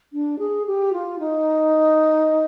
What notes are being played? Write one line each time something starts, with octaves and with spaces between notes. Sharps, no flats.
D4
G#4
G4
F4
D#4